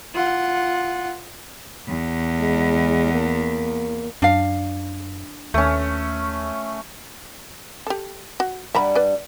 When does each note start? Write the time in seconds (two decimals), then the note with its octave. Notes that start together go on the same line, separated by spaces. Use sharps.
0.14 F4 F#5
1.88 E2
2.40 G#3
3.14 A#3
4.22 F#2 D4 F5
5.54 D#2 A3 C#4
7.87 G4 A4
8.40 F#4
8.75 G2 G3 E5 F#5 A#5 B5
8.95 B4 D5